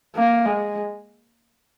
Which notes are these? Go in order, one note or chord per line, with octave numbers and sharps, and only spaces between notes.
A#3
G#3